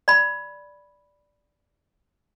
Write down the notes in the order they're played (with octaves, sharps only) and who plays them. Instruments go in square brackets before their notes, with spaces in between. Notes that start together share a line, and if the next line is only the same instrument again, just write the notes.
[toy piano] D5 B5